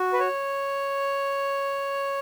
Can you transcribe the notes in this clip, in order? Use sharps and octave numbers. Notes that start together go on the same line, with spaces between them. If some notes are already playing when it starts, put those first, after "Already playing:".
Already playing: F#4
B4
C#5